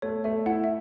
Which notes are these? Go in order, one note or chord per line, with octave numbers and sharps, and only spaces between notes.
A3 C#5
A3 E5
E4 F#5
E5